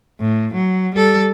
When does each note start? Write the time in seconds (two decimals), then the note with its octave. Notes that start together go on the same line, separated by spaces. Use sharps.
0.20 A2
0.54 F#3
0.95 G3 A4